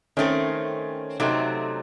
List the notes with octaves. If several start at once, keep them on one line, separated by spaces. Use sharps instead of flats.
D#3 A3 C4 C#4
C3 F#3 A3 C4 D#4